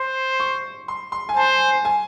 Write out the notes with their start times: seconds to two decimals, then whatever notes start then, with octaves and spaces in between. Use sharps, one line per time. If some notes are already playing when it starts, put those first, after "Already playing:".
Already playing: C5 C6
0.40 C#6
0.88 C6
1.12 C6
1.29 G#5
1.37 C5 A5
1.85 G#5